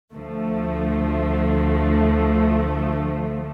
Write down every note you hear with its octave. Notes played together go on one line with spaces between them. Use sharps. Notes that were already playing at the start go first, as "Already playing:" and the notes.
D2 D3 F3 A3